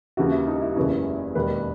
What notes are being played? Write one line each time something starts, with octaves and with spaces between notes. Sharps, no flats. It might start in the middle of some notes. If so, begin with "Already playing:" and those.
D#2 C#3 E3 F#4
E4
D#4
E4
F#1 E2 C#3 E3
E1 D#2 D#3 B4